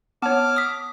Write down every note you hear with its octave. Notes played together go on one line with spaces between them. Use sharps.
B3 C#5 A5 D6 F6
D#6 B6